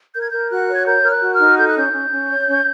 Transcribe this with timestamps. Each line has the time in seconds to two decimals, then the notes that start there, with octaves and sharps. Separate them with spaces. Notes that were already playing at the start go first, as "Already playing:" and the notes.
0.14 A#4 G6
0.21 G#6
0.29 A#4 G6
0.50 F#4 F#6
0.67 C#5
0.74 G#6
0.85 A#4 G6
1.03 A#4 F6
1.10 F#6
1.21 F#4
1.33 F6
1.39 D#4
1.57 A4 G6
1.67 F#6
1.75 C#4 G6
1.92 C#4
2.10 C#4
2.28 C#5
2.46 C#4